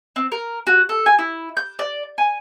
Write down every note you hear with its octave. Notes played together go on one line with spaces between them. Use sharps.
C4
A#4
F#4
A4
G#5
E4
G6
D5
G#5